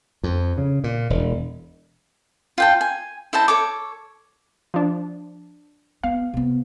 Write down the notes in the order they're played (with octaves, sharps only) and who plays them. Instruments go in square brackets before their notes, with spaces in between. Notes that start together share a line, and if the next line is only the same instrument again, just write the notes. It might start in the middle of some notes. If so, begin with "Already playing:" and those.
[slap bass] F2
C#3
A#2
E1
[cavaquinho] F4 G5 A5
G#5
E4 C5 D#5 A5
A4 C#5 D6
[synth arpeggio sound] F3 D4
[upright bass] B3 [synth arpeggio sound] F5
[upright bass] C3 B3